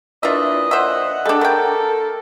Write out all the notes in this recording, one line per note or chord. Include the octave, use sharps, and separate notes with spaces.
A#2 D4 E4 F4 B4 D#5 E5
C5 E5 F#5
G3 G#3 D4 A4
A3 A#4 G5